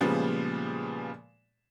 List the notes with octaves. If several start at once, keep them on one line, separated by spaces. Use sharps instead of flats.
A#2 C#3 F3 G3 G#3 B3